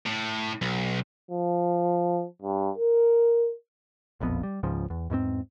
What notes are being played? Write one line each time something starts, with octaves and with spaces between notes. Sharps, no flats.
A2
B1
F3
G2
A#4
E1 A#1 F2 B3
G3
C#2 G#2 C#3 F3
E2
E2 G#2 G3 C4